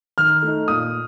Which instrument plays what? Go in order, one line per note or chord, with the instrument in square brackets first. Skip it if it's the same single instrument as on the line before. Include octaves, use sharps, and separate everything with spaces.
[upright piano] D#3 [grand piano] F6
[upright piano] A3 D#4
[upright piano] A#2 [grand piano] D#6